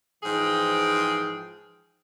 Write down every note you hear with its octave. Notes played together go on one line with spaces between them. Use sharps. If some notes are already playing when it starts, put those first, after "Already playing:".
G#2 E3 F3 G#4 F5 G5